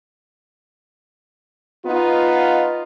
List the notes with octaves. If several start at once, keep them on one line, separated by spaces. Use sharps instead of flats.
B3 D#4 F4